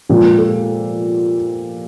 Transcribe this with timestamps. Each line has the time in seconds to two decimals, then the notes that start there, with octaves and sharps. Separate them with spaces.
0.09 A#2 F3 G#3 G4
0.38 A4